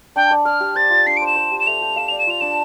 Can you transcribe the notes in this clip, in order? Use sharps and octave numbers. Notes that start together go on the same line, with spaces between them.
D4 G5
D5
D5 F6
G4
C5 A6
F4
D4 C7
C5 D7
E7
C5
G4
E7
A3 F7
G4
F5 E7
D5 F7
E7
F4 F7
D4 E7